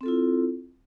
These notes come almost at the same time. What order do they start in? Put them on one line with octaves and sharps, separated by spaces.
C4 A4 F4 E4